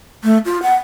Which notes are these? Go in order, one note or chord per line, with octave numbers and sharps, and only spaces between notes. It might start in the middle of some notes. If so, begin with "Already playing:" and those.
A3
F4
F#5